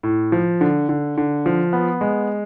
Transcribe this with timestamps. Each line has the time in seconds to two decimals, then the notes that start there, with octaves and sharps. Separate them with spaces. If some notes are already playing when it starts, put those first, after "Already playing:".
0.03 A2
0.32 F3
0.61 D3
0.89 D3
1.17 D3
1.46 F3
1.73 B3
2.01 G#3